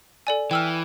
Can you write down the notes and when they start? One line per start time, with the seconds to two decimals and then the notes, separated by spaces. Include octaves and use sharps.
0.27 A4 D5 G#5
0.51 E3 G5 E6 F6